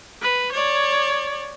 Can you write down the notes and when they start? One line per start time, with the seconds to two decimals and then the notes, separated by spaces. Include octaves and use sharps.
0.22 B4
0.53 C#5 D5